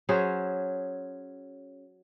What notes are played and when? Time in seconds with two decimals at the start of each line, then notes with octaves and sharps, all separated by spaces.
0.09 F#3 C#4 G#4 C5